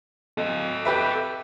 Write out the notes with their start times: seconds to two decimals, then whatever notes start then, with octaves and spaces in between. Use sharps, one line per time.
0.38 A4 D#5
0.85 G4 B4 E5